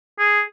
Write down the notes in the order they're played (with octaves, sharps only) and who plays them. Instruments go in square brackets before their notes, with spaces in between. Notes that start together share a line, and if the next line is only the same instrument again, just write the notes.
[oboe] G#4